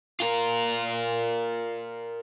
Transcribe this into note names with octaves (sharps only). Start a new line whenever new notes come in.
F4 A#4